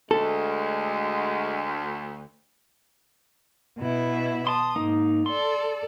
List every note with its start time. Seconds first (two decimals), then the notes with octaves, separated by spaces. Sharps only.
0.11 D2 G#3 A4
3.78 B2 E4
4.47 A5 C6 D#6
4.76 G#2 A#3 D#4
5.26 A4 D5 C6